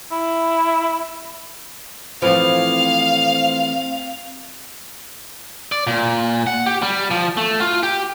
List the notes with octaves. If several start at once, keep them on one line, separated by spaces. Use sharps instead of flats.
E4
A2 E3 F3 C4 F5
D5
A#2
F#5
G4
G3
F3
A3
F4
G4